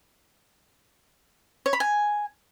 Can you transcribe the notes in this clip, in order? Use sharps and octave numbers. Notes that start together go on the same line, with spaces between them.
C#5
B5
G#5